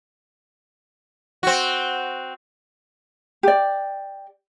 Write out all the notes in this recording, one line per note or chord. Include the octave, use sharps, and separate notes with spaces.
C4 F#4
G4 D5